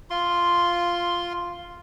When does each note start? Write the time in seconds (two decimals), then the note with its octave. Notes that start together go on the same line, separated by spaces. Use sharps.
0.10 F4 C6